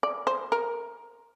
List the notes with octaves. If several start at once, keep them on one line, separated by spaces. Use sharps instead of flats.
D5
C5
A#4